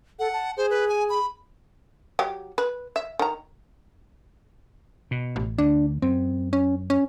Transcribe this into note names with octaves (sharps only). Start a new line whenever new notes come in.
A4 F#5
A5
G#4 C5
B4
G#5
B5
F#3 G4
B4
E5
D#3 A#5
B2
A1
D2 D4
F#2 C4
C#4
C#4